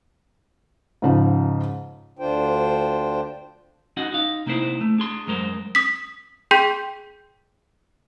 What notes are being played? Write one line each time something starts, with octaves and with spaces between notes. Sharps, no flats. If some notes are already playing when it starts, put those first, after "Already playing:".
G#2 C#3 F3
D2 D3 D4 F4 C5 G5
C#4 D#4 F#4 D#5 F#5
D#4 F5
C3 A#3 D#4 E4 C5
A3
D4 G#4 C6
F#2 G#3 A#4 C5
D#6 B6
G#4 G5 C6 G6 B6